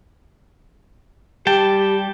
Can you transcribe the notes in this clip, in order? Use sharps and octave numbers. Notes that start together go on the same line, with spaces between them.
G3 G4 G5 A5